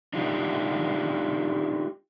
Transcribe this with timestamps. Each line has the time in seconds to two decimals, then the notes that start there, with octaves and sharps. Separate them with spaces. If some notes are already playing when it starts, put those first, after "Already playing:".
0.13 D4 D#4 F4 G4